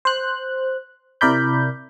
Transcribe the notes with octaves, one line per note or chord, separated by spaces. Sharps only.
C5 F#6
C3 E4 A#4 D5 B5 G6